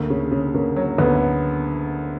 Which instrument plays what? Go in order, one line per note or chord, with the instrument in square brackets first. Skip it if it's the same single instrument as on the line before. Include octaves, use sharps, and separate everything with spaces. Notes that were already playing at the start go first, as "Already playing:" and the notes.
Already playing: [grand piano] D2 [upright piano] A#3
[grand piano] C#3
C#3
[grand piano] C#3 [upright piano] A#3
[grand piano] F#3
[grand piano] D2 [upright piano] B3